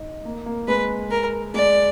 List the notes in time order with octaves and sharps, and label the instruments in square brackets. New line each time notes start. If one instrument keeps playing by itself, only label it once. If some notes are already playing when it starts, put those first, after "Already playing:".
Already playing: [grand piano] D#4
A#3
A#3
[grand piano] G#3 [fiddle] B4
[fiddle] A#4
[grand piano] G#3 [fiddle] D5